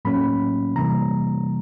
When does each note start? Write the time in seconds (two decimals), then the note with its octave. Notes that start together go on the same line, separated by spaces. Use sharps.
0.05 A2 F#3 A#3 C#4 B5
0.75 C3 E3 G3 A#3 A#5